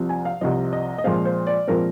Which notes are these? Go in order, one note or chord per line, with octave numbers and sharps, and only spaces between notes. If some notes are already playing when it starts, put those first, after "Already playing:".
Already playing: C2 C3 F3
G#5
F5
C2 C3 F3 D#5
D#5
D#5
A#2 F3 G#3 C4 F5
C5
D5
A#2 F3 G#3 C4 A#4